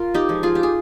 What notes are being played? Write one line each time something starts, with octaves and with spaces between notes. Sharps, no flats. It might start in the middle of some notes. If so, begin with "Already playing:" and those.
Already playing: F4 A#4
D#4 G4
F3 G#3
F4 G#4
G4
G#4